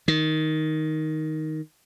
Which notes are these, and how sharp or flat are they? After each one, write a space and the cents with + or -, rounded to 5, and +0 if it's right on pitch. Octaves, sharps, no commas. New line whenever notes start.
D#3 +5